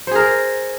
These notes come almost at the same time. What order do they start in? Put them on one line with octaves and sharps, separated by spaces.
C5 G#4 A#4